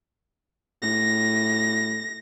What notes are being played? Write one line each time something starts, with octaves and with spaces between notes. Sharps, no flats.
A2 A#6